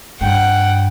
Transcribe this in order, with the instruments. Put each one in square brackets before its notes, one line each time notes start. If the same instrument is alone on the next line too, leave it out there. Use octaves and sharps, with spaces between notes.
[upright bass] G2 [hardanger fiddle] F#5 [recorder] G5